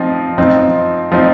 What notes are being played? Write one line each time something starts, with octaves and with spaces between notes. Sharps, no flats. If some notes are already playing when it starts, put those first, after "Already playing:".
Already playing: F3 C4 D#4
F3 C4 D#4
F3 C4 D#4